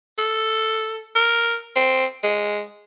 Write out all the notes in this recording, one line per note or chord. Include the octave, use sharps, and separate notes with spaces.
A4
A#4
C4
G#3